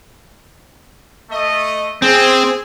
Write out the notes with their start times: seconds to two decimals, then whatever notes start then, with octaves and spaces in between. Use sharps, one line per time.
1.31 A3 D#5
2.02 C4 G#4